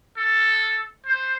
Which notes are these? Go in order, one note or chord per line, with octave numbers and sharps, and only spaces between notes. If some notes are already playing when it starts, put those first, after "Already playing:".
A4
C5